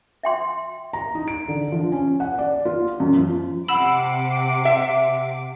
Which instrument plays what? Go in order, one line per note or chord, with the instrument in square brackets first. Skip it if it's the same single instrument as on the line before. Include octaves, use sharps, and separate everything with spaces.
[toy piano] E5 G5 C6
[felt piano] A#5
D#4
D7
D3
F3
C#4
F#5
D5
F4
F#2
F3
[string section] C3 D6 [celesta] F#5 E7 [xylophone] B5 E6
[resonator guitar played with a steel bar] E5